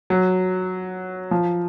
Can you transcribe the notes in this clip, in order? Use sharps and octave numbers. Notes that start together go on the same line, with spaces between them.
F#3
F3